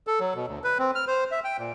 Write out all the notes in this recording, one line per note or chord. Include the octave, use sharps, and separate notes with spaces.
A4
F#3
B2
D2
B4
C4
F6
C5
E5
G5
A#2